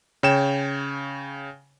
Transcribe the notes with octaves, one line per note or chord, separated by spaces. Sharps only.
C#3 C#5 G5 E7